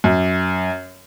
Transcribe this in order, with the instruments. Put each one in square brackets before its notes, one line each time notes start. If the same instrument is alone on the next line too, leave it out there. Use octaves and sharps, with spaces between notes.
[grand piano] F#2